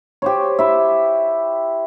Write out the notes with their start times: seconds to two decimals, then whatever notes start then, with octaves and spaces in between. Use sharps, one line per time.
0.22 G4 C5 C#5
0.59 E4 E5